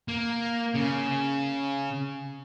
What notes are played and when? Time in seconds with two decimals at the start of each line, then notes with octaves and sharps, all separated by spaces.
0.08 A#3
0.74 C#3